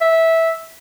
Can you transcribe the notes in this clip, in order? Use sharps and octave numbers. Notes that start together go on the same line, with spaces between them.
E5